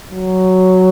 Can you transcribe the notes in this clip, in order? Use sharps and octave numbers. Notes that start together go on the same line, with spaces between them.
F#3